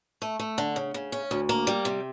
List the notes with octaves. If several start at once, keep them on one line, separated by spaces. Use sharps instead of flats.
A3
A3
D3
C#3
C#3
C#4
D2
A#3
G3
C3